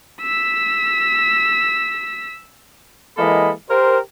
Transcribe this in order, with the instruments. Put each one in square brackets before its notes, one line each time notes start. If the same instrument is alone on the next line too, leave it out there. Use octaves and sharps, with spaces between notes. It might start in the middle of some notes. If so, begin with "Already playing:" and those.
[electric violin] E6 B6
[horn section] E3 G#3 A#3 A4 D#5 B5
G4 A#4 C5